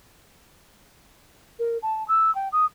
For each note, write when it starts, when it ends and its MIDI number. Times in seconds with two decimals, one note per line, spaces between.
1.59 1.77 70
1.82 2.06 81
2.08 2.33 88
2.35 2.48 79
2.52 2.65 87